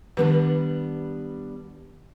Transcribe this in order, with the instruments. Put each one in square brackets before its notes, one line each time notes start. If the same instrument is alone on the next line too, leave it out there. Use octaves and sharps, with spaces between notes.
[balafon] D#3 B4 [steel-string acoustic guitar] G3 B3 D4